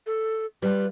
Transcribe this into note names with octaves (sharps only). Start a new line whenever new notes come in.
A4
G3 F4 B4